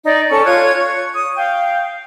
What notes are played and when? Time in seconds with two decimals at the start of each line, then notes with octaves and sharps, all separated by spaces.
0.05 D#4 D5
0.30 C#4 A4 C#6
0.45 F4 C#5 F#6 G#6
0.76 C#6
1.14 D#6
1.35 F5 G5